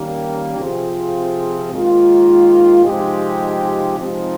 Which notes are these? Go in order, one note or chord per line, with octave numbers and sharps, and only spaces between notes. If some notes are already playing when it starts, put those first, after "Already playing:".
Already playing: D#3 G3 A#3 C#4 G4
C3 F3 C4 F4 G#4
G#2 D#3 A#3 F4
C3 F3 G#3 D#4 G4
C3 F3 G#3 C4 D#4